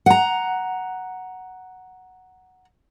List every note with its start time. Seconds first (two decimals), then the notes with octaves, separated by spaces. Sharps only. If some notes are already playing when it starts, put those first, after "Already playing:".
0.06 F#5 A#5